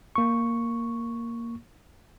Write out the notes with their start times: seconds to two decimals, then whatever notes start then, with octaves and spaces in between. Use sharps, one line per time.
0.16 A#3 C#6